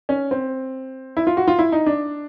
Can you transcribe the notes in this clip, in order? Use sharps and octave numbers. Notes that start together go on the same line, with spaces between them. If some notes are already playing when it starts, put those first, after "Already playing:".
C#4
C4
E4
F4
F#4
F4
E4
D#4
D4